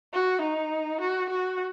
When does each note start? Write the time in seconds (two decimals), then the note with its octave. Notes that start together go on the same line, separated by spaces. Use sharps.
0.14 F#4
0.42 D#4
1.01 F#4
1.30 F#4